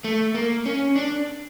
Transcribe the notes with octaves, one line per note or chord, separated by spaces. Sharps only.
A3
A#3
C#4
D4